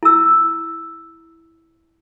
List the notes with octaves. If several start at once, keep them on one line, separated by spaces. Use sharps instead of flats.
E4 E6